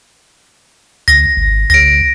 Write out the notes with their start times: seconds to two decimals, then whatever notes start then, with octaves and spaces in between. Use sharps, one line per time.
1.08 D2 A#6
1.37 G#1
1.70 D2 A#6 D7